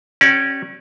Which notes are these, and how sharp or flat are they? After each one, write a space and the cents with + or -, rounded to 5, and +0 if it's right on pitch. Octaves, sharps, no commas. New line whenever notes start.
C#4 -20 G4 -30 D5 +0